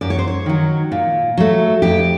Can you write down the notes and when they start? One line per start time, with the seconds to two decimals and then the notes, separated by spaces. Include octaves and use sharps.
0.01 F#2 D5
0.10 C#5
0.19 C5
0.27 C#5
0.46 D#3 F#3
0.92 A#2
1.37 F#3 A3
1.82 F2 G4